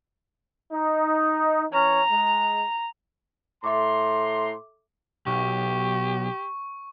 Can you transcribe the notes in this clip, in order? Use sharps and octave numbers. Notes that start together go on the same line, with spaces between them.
D#4
E3 C#4 A#5
G#3
A2 A4 E5 A#5 C6 D6
B1 G4 C#6